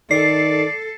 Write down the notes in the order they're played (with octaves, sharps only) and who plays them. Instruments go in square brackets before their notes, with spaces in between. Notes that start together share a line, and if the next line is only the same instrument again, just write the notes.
[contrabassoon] D#3 [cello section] A4 [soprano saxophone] D5 [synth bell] C7